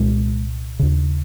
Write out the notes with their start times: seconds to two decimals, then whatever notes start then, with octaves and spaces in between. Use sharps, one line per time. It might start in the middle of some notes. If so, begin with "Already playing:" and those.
Already playing: C2 A#2 G#3
0.79 D#2 C#3